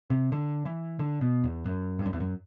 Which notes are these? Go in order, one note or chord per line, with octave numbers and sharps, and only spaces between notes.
C3
D3
E3
D3
B2
E2
F#2
G2
F#2
E2
F#2